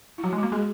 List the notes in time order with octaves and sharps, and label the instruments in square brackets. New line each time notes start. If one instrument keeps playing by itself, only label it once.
[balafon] E4
[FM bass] F#3 [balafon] F#4
[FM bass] G#3
[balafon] F#4
[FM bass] A#3
[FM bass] G#3 [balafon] G#4